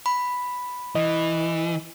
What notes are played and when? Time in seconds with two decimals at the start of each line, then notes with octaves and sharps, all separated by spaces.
0.06 B5
0.95 E3 D#5